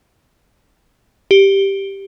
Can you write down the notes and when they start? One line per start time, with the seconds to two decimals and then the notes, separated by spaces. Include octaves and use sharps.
1.31 G4